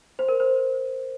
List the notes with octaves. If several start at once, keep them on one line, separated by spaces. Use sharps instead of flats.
C5
A#4
C5